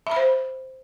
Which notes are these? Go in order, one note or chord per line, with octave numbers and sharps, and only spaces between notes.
C5 E5 B5